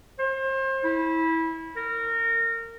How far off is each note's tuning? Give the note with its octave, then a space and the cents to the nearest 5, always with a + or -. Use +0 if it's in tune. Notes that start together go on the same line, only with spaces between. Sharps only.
C5 +35
E4 -20
A#4 -25